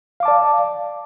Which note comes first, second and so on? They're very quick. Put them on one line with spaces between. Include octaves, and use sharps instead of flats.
F5 D6 A5 D5